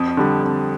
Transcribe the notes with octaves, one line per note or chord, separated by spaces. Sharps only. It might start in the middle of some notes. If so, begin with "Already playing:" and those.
Already playing: F2 D#6
D3 G3
F2